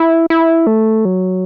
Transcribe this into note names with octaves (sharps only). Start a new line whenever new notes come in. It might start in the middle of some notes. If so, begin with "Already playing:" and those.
Already playing: E4
E4
A3
F#3